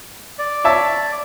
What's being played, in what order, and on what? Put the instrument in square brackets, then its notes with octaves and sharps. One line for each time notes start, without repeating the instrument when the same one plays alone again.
[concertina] D5
[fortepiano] C#5 E5 A5